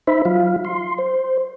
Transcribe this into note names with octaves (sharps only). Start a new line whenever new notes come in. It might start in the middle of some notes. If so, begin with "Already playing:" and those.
D#4 C5 E5 B5
F#3 F4 F5
C6
C5